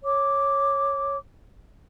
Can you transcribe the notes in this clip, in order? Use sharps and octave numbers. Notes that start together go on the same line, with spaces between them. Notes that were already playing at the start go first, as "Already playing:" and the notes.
C#5 D6